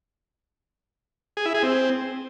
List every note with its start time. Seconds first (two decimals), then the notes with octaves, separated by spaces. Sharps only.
1.37 G#4
1.46 E4
1.54 G#4
1.63 C4